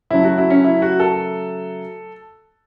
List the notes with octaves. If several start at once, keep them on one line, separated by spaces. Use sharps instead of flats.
C#3 F#3 A3 E4
F#4
E4
C#4
E4
F#4
A4